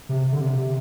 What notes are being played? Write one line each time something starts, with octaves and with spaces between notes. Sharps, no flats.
C3
D3
C3
C3